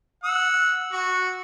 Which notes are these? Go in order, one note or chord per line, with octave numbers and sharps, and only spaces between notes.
F#5 E6
F#4